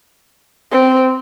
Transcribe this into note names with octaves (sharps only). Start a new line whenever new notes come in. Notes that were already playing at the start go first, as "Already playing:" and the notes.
C4